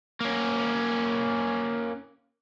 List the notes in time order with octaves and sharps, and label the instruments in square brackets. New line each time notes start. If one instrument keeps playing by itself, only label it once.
[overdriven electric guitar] A#3 C#4